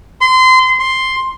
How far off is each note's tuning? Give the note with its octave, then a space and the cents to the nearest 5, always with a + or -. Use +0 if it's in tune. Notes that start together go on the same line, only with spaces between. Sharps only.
C6 -25
C6 +5